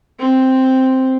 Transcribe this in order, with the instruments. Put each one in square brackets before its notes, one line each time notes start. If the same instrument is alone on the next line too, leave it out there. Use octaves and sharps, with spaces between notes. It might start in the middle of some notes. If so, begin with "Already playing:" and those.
[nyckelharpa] C4